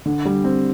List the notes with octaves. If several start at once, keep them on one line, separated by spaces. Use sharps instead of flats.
D3
G3
C4